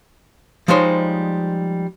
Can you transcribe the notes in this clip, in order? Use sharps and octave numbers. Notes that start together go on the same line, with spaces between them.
F3 G3 G#3 D#4 C5 C#5